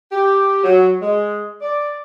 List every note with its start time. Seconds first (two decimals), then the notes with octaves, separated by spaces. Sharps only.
0.12 G4
0.64 F#3
1.02 G#3
1.62 D5